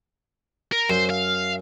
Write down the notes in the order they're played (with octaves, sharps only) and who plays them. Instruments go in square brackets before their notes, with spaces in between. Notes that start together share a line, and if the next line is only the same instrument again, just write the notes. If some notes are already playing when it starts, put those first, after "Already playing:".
[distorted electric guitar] A#4
[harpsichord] F#2 [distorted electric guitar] C5
[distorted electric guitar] F5